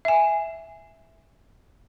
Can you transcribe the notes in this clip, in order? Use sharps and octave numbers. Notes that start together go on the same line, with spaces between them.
E5 G#5